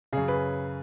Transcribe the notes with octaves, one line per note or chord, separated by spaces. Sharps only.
F#2 C#3 G#4
B4